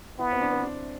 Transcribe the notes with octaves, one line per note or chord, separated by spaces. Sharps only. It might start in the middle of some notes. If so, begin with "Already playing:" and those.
B3 E4
C4
D4
C4
D4